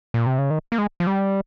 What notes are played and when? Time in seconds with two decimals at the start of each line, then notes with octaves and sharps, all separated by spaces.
0.14 A#2
0.26 C3
0.38 C#3
0.50 D#3
0.72 A#3
0.78 G#3
1.00 F3
1.07 G3